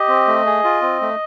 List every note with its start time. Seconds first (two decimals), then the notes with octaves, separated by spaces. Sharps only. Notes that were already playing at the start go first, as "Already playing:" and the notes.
Already playing: G4 D#5
0.08 C4
0.27 A3
0.46 G#4
0.64 F4
0.82 C4
1.01 A3